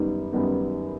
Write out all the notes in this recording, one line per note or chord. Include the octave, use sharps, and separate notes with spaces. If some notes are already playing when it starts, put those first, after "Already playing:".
Already playing: F#2 D#3 G3 B3 D#4
F#2 D#3 G3 B3 D#4